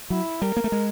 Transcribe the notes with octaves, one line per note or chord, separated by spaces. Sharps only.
F#3 E4
G3 A#4
A#3
A3
G#3